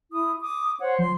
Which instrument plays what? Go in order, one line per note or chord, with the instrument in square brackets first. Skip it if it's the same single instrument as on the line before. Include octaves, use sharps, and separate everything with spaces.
[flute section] E4 D#6
D6 D#6
C5 C#5 F#5
[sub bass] F3 [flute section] C6